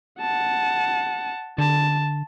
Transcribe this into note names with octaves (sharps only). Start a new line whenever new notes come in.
F#5 A5
D3 A5